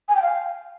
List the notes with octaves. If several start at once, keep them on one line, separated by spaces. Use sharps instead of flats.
G#5
G5
F5